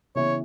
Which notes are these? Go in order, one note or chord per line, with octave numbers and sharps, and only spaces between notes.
C#3 E3 B3 E4 C#5